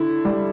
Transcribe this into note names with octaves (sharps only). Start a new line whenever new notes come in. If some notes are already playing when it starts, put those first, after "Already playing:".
Already playing: D3 E4
G3